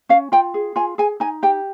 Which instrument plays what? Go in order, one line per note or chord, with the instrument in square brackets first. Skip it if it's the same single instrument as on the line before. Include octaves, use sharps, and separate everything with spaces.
[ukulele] C#4 F5
F4 G5
G#4
F4 G#5
G#4 G#5
D#4 G#5
G4 G5